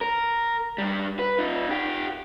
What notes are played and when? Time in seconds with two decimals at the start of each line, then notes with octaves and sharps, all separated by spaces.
0.01 A#4
0.78 G2 G3
1.19 B4
1.39 D#4 F4
1.69 F4 G4